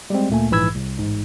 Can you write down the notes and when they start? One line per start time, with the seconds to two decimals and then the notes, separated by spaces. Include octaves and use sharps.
0.10 G3 G#3 C4
0.29 D2 A#2 A3 A#3 G#5
0.51 A#1 G#2 E3 B5 E6 G#6
0.75 C2
0.99 A1 G#2